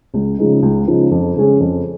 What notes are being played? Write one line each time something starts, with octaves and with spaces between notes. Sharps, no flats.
C#2
C#3 F3 G#3 D#4
C#2
C#3 F3 G#3 D#4
F2
C#3 G#3 C#4 G#4
F2